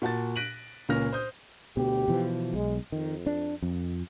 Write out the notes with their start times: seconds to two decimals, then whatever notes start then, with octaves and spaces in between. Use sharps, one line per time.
0.02 A#2 F#4 A5 A6
0.36 F#6 A#6 B6 D7 D#7 F#7
0.89 C#2 A#2 A#3 C#4 F6 A#6
1.12 C5 D#6 G6
1.77 D2 B2 G4
2.08 B2 E3 F3
2.53 B1 G#3
2.92 F2 D#3
3.26 D4
3.62 F2